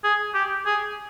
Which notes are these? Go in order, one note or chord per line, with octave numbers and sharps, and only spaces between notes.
G#4
G4
G#4